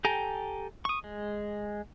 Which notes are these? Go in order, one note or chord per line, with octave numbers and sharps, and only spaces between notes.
G4 A4 G5 G#5 A#5
C#6 D#6
G#3